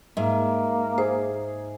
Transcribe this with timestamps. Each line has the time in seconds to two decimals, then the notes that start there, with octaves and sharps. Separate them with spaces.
0.17 G#2 A#3 E5
0.98 G#4 C5